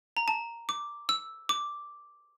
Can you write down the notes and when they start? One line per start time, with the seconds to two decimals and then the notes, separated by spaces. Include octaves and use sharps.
0.17 A#5
0.28 A5
0.69 D6
1.09 E6
1.49 D6